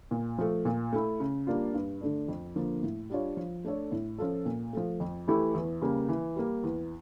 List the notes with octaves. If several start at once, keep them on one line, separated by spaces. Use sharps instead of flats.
A#2
F3 A3
A#2
A3 E4
C#3
G3 A#3 D4 F4
G2
D3 A3 D4
F2
D3 F3 A#3
A2
G3 D4 F4 C#5
F3
A3 D4 A4 C#5
A2
F3 C#4 F4 A4
A#2
F3 A3
F2
E3 A3 E4 G4
E2
C#3 G3 A#3
E3
G3 A#3
E2